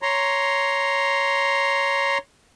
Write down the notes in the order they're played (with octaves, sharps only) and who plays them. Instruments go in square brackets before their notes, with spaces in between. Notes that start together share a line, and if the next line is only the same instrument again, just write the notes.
[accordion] C#5 A#5 C6